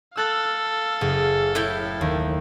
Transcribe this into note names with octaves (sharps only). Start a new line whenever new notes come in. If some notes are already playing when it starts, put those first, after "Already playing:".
A4 F5 E6 F#6 A6
F#1 G#4
A2 E4 G5
D#2